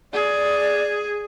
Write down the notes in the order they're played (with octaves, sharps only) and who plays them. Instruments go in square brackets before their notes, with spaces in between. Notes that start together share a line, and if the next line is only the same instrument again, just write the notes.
[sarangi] G#4 [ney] D5